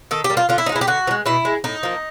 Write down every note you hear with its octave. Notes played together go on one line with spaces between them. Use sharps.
D#3 A4
G4
G3 A#3
F4
D3 F4
E4
F3 D#4
G#3 E4
G4
D3 F#4
F3
G#3
B2 E4
G#3
A2 D#4
F3 A#3